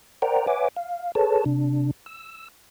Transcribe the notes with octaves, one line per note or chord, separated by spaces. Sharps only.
A#4 C5 D5 F#5 G5 A#5
B4 C#5 E5 F#5 G#5 D6
F5
G#4 A4 B4 C#5 A5
C3 D4
E6